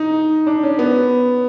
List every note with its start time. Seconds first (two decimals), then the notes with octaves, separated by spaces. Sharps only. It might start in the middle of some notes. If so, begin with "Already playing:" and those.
Already playing: D#4
0.47 D4
0.63 C#4
0.79 B3